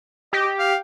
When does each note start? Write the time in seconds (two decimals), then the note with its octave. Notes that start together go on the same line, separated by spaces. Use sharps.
0.33 G4 D#5
0.59 F5